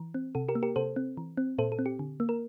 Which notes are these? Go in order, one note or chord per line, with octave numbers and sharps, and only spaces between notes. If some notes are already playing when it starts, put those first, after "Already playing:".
Already playing: E3
C4
C3 A4
G4 A#4
A#3
G4 A#4
C3 A4 C5
C4
E3
C4
A#2 A4 C5
A4
C4
G4
D3
A#3
A#4